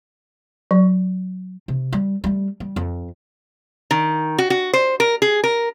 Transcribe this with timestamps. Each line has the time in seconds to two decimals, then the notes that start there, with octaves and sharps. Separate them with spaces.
0.71 F#3
1.68 C3
1.93 G3
2.24 G3 A3
2.60 G3
2.76 F2
3.91 D#3
4.38 F#4
4.50 F#4
4.73 C5
5.00 A#4
5.22 G#4
5.44 A#4